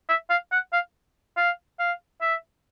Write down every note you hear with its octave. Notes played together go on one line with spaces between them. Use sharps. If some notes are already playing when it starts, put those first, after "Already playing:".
E5
F5
F#5
F5
F5
F5
E5